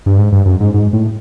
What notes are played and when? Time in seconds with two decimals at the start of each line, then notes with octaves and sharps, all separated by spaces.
0.06 G2
0.18 G#2
0.32 G2
0.46 F#2
0.60 G#2
0.74 G#2
0.93 A2